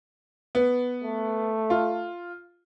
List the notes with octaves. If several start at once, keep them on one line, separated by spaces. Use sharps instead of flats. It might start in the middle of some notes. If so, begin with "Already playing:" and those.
B3
A3
F4